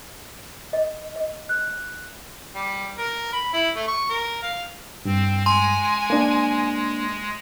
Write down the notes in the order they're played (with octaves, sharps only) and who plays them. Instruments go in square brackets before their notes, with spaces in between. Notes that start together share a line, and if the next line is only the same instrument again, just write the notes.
[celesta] D#5
D#5
F#6
[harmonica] G3
A#4
B5
E4
A3
C#6
A#4
F5
[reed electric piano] G2 [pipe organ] C4
[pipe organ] G#3 [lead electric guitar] G#5 [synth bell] C6
[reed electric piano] A#3 D4